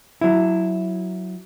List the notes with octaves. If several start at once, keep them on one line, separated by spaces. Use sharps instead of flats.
F#3 E4